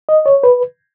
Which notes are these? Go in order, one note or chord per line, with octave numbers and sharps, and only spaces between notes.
D#5
C#5
B4